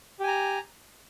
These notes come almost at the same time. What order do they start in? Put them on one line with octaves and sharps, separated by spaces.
G4 G#5 A#5